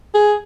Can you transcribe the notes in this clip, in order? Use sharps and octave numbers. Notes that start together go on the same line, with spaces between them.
G#4